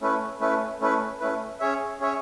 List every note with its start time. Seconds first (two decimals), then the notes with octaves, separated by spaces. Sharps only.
0.01 A3 C#4 E4 B4
0.40 A3 C#4 E4 B4
0.81 A3 C#4 E4 B4
1.20 A3 C#4 E4 B4
1.60 C#4 G#4 C#5 E5
2.00 C#4 G#4 C#5 E5